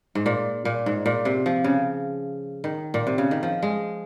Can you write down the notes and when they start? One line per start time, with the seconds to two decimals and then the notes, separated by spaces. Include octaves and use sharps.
0.15 G#2
0.26 A#2
0.65 A#2
0.86 G#2
1.06 A#2
1.25 C3
1.46 F3
1.64 C#3
2.64 D#3
2.94 A#2
3.07 C3
3.18 C#3
3.31 D#3
3.43 F3
3.63 G#3